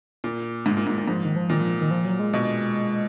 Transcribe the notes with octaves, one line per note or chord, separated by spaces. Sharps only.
A#2
G#2
A#2
G#2
A#2
G#2 F3
D#3
F3
A#2 D#3
F3
D#3
F3
F#3
G#3
B2